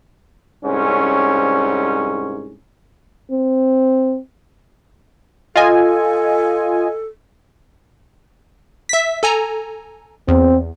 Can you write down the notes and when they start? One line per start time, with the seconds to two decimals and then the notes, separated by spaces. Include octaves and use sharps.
0.64 C2 G#2 C#4
3.31 C4
5.56 F4 A4 D#5 G#5
8.89 E5 B6
9.23 A4 G#5 A#5
10.28 E2 C4